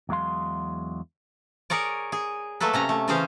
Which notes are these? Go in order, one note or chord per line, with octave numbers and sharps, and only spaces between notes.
E2 F#3 G#3 F5 C6
G#4 A#4 C#5 D5
G#4
F#3 A3 A#3 A4 B4
C3 C#4 A#5
A3
C#3 E3 C#4 G#4 C5 F5